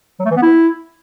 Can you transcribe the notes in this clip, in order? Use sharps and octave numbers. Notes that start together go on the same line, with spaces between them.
F#3
A3
E3
B3
E4